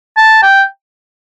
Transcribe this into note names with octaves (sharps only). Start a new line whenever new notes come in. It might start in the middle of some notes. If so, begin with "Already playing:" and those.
A5
G5